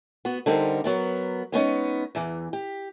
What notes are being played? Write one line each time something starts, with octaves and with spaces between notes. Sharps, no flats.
B3 F#4
D3 G3 C4 D#4 A#4
F#3 B3 A#4
G#3 B3 C#4 D#4
E2 E3
G4